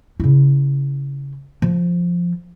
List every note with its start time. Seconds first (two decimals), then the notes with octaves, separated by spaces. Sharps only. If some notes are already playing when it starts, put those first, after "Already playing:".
0.20 C#3 E4
1.62 F3